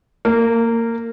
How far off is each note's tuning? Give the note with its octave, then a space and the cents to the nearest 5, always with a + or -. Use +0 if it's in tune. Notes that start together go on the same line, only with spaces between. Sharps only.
A#3 -20